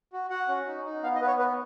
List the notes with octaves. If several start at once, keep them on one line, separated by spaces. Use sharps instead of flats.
F#4
F#4 F#5
C#4
D#4
D#4
B3 F5
D#5
B3 B4
C#5
B3 B4